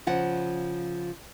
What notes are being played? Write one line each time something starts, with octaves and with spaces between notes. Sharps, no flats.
C#3 F3 F#5